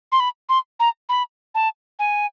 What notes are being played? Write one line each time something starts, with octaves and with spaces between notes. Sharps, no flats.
C6
B5
C6
A#5
B5
A5
G#5